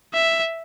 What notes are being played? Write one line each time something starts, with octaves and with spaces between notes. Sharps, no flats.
E5